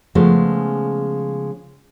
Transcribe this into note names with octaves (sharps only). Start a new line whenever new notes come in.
C#3 F3 G#3 A3 B3 C#4